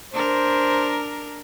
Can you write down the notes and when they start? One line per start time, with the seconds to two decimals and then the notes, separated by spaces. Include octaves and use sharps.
0.14 D4 A#4 C5